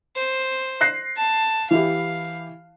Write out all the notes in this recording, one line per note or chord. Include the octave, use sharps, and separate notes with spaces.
C5
F#6 A#6 C7
A5
E3 E4 G4 F5